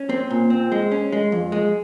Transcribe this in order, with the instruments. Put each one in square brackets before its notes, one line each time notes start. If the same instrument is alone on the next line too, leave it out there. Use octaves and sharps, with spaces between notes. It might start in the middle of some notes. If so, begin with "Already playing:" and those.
Already playing: [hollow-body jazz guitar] C#4
C4
A#2
C4
G#3
C#4
G#3
F2
G#3